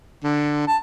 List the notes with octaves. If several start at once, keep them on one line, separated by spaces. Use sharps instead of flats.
D3
A5